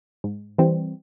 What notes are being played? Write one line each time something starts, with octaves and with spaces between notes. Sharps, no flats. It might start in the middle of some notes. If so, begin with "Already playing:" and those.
G#2
E3 G3 C4